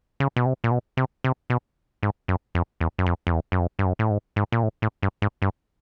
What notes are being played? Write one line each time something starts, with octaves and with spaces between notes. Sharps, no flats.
C#3
B2
C3
A#2
B2
C3
C3
B2
G#2
F#2
F2
E2
F#2
F2
F2
E2
F#2
F2
G2
F#2
A2
G#2
G#2
A#2
A2
A2
G2
G#2
G2